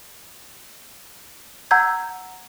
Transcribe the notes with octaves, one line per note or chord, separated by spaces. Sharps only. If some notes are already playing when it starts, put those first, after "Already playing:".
F#5 A#5 E6 G6 G#6